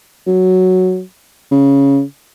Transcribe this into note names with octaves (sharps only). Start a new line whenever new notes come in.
F#3
C#3